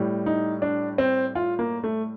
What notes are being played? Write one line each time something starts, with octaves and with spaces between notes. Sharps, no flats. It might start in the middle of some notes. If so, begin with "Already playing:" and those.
Already playing: A2 G3
D#4
D4
C4
F4
A#3
A3